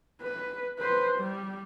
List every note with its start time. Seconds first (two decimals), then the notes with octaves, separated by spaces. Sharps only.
0.22 B4
0.79 B4 C5
1.19 G3